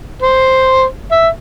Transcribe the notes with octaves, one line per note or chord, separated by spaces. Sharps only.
C5
E5